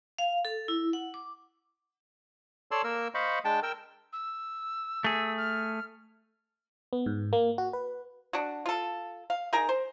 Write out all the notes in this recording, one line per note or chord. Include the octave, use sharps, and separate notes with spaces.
F5
A4
E4
F#5
D6
A4 C#5 D5 A5 C6 E6
A#3 A#4 E6
C5 D#5 F5 B5 C#6
G#3 D4 G5 A5
A#4 G5 E6
E6
A3 G#4
F6
B3
G#2
A#3
F#4
B4
D4 F#4
F4 A4
F5
D#4 G#4 A#4 A#5
C5